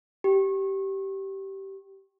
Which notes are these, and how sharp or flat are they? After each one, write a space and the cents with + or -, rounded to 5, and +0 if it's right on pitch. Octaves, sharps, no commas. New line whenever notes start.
G4 -15